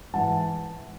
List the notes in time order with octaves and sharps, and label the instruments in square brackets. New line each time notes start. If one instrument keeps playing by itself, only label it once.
[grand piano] G#2 E3 F#5 A5